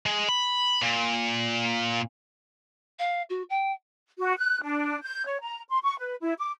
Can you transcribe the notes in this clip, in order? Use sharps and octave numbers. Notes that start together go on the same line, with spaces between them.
G#3
B5
A#2
F5
F#4
G5
F#4
F#6
D4
G6
C#5
A#5
C6
C#6
B4
E4
D6